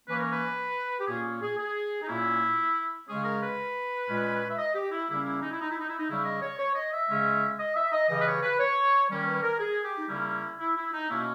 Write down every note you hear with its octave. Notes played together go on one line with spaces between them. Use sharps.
E3 A#3 C#4 B4
A#4
B4
G4
A#2 A#3 C#4 G#4
G#4
G#4
D#4
A#2 A#3 C#4 E4
C#3 G#3 C#4 G#4
A#4
B4
A#2 G#3 C#4
E5
D#5
G4
E4
C#3 G3 A#3 C#4 E4
E4
D#4
E4
D#4
E4
D#4
E4
D#4
C#3 G3 C#4 E4
D#5
C#5
C#5
D#5
E5
C#3 G#3 C#4
D#5
E5
D#5
C#3 E3 G3 D#5
B4
C#5
B4
C#5
D#3 G3 A#3 C#4
B4
A#4
G#4
G4
D#4
C#3 G3 A#3 C#4 E4
E4
E4
D#4
B2 A#3 C#4 E4